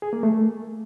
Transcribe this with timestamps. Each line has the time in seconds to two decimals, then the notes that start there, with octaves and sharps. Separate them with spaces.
0.02 G#4
0.13 A#3
0.23 A3